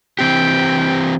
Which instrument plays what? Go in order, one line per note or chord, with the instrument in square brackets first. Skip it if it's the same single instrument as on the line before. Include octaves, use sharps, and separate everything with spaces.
[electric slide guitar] E3 C4 G4 [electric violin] G5